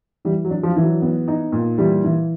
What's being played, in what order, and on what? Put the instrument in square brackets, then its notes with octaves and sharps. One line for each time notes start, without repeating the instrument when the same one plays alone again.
[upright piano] E3 [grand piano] G3
[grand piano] F#3
[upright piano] D4
[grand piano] F3
[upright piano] E3
[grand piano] F#3
[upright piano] B3
D#4
A#2
[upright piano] E3 [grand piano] G3
[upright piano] E3